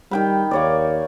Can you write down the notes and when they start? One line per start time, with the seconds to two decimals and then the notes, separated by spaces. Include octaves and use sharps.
0.11 D#3 G3 G5 B5
0.51 D#2 A#3 C#5 D5